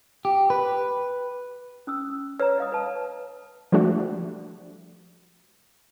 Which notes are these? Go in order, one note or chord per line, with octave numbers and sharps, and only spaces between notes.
G4
B4
C#4 D#6 E6
B4 C#5 A#5
D#5 F5 D#6
B4 A5
F3 G3 A3 D4 F#4